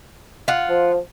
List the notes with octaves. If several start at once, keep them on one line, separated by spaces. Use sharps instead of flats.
F4 F#5
F3